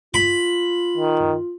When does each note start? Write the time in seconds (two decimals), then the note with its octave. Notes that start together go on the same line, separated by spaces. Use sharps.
0.14 F4 B5
0.97 D#3